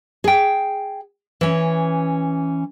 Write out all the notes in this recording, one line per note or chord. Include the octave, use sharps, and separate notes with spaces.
G#4 G5
E3 C#4